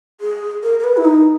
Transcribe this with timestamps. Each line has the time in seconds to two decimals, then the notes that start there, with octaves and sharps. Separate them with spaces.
0.21 G#4
0.63 A#4
0.80 A#4
0.84 B4
0.97 E4
1.05 D#4